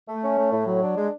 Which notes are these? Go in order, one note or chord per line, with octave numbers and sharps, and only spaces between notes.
A3
C#4
A3
A2
F#3
D4
G#3